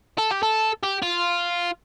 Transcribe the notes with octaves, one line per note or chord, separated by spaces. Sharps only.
A4
G4
A4
G4
F4